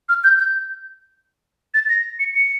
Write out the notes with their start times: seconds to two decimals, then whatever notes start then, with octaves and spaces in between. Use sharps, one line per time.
0.09 F6
0.24 G6
0.39 G6
1.74 A6
1.89 A#6
2.19 C#7
2.35 C#7